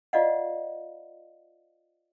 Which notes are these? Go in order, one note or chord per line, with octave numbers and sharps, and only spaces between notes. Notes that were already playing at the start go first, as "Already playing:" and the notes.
F4 C5 D5 D#5 F5 F#5